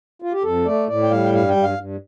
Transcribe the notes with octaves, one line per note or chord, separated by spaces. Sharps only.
F4
G4
F2 A4
A3 D5
A2 D5
G5
G3 F5
G5
G2 F5
G5
G2
F5
G2